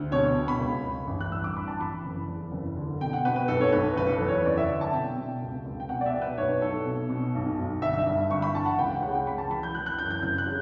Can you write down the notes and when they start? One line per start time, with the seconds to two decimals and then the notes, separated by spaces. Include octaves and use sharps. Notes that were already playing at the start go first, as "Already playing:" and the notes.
Already playing: D2
0.12 B2 C#5
0.35 B2
0.48 B5
0.59 C#2
0.84 C#2
1.07 A1
1.21 F#6
1.32 G2 E6
1.44 D6
1.57 A1 B5
1.68 A5
1.81 E3 B5
2.05 F#1
2.28 E2
2.52 F#1
2.76 D3
3.01 B2 G5
3.13 F#5
3.25 B2 B4
3.36 B4
3.48 B1 A4
3.61 C#5
3.72 B1 B4
3.96 F#1 B4
4.07 A4
4.13 B4
4.20 E2
4.28 C#5
4.45 F#1 D5
4.57 E5
4.69 D3
4.81 A5
4.93 B2 G5
5.17 B2
5.42 C#2
5.66 C#2
5.80 G5
5.89 B2 F#5
6.01 D5
6.06 E5
6.13 B2
6.22 B4
6.37 B1 C#5
6.61 B1 A4
6.86 B2
7.09 B2
7.35 B1
7.58 B1
7.82 G1 E5
7.98 E5
8.06 G2
8.30 G1 C#6
8.42 B5
8.55 E3 A5
8.66 F#5
8.79 C#2 G5
8.91 F#5
9.02 C#3 F#5
9.15 G5
9.27 C#2 B5
9.38 A5
9.50 E3 B5
9.63 G6
9.75 E3 F#6
9.86 F#6
9.99 F#2 G6
10.11 G6
10.22 F#1 G6
10.38 F#6
10.46 C#3